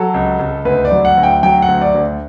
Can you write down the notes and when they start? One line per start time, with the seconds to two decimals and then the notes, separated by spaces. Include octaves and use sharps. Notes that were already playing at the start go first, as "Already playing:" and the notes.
Already playing: F#3 A4
0.14 C#2
0.39 C#2
0.65 D2 B4
0.85 D5
0.92 F#3
1.05 F#5
1.17 D2
1.23 G5
1.43 F#3 G5
1.62 F#5
1.68 D2
1.82 D5
1.95 D2